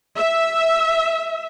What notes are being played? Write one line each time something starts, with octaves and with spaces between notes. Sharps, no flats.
E5